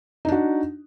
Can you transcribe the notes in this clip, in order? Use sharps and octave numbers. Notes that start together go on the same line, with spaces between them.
D4 D#4 F#4